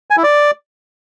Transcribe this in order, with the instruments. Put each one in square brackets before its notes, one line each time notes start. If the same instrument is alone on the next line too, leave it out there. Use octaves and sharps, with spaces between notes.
[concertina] G#5
E4
D5